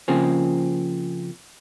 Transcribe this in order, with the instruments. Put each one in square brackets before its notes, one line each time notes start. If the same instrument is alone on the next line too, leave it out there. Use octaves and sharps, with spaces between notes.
[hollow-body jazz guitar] C#3 F3 A#3 C4 G#4